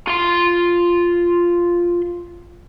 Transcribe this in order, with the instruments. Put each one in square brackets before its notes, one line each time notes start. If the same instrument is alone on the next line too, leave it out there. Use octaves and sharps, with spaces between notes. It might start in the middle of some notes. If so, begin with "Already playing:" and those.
[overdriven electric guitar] F4 C6